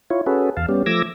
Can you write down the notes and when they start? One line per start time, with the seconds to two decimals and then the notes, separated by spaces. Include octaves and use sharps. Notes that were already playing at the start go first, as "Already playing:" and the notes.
0.10 E4 F4 C#5
0.26 C#4 F#4 G#4 A4 B4
0.57 E2 F5 A5
0.69 G3 B3 C#4 G4
0.86 F3 A3 D6 E6 G#6 A#6